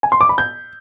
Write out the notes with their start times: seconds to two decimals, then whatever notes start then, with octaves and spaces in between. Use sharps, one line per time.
0.03 G#5
0.12 C6
0.21 D6
0.29 B5
0.38 G6